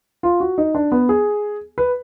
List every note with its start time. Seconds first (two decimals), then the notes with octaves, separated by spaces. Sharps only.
0.23 F4
0.40 F#4
0.58 D#4
0.75 D4
0.92 B3
1.09 G#4
1.78 B4